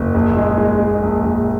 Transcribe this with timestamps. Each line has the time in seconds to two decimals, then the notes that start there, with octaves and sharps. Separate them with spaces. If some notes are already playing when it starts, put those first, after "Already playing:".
Already playing: F#1
0.15 A#1
0.37 G#3
0.58 G#3
0.80 G#3
1.02 A#1
1.24 A#1